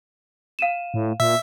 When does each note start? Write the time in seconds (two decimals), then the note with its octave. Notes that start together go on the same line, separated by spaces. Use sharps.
0.59 F5 D#7 E7
0.94 A2
1.20 A#2 E5